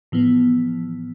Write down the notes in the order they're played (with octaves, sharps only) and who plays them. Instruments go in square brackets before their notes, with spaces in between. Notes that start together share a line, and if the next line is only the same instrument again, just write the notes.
[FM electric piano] A2 E3 F3 B3